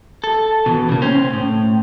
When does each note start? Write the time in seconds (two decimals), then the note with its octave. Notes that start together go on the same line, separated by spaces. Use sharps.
0.24 A4
0.66 B2 E3
0.89 C#3 A#3
1.02 C#4 C5
1.33 A2